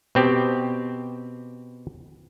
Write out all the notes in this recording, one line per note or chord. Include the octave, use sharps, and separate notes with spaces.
B2 C4 G4